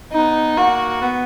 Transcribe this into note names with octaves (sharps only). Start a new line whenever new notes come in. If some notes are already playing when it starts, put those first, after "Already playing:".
B3 D#4
A#3 F#4
B3